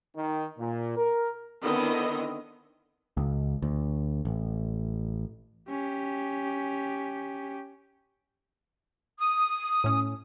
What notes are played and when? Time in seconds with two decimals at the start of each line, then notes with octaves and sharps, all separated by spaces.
0.16 D#3
0.58 A#2
0.97 A#4
1.61 D3 D#3 B3 C4 E4 D#5
3.17 C#2
3.62 D2
4.25 A1
5.69 C#4 G4
9.19 D#6
9.84 A2 C#4